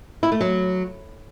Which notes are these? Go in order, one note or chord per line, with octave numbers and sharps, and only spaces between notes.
E4
A3
F#3